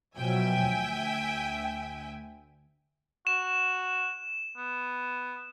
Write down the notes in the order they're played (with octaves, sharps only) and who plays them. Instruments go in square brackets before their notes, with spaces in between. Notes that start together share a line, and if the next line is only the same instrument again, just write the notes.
[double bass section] B2 F3 F#3 [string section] E5 G5 G#5
[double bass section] D2
[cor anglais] F#4 [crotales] E7
[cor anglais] B3